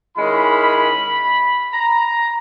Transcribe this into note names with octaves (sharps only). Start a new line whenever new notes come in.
D#3 G#3 C#4 E4 B5
A#5